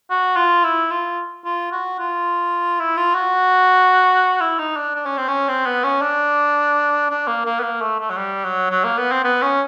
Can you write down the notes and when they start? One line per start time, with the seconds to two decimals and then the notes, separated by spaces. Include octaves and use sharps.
0.10 F#4
0.36 F4
0.64 E4
0.91 F4
1.45 F4
1.72 F#4
1.99 F4
2.80 E4
2.97 F4
3.14 F#4
4.41 E4
4.59 D#4
4.76 D4
4.95 D4
5.05 C#4
5.17 C4
5.28 C#4
5.48 C4
5.66 B3
5.84 C#4
6.01 D4
7.10 D4
7.27 A#3
7.45 A#3
7.59 B3
7.63 A#3
7.81 A3
8.00 A3
8.10 F#3
8.17 G3
8.44 F#3
8.70 F#3
8.84 A#3
8.98 B3
9.11 C4
9.24 B3
9.42 C#4